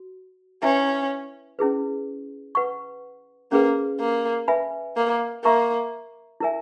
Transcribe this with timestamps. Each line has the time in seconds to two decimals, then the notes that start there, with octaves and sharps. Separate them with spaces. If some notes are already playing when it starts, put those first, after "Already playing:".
Already playing: F#4
0.62 C#4 E4 B4 E5
1.59 C#4 E4 G#4 B4
2.55 B4 F#5 C#6
3.52 A#3 C#4 G#4 B4
4.00 A#3
4.48 B4 E5 G#5 B5
4.97 A#3
5.44 A#3 A#4 E5 A#5 C#6
6.40 E4 A#4 E5 G#5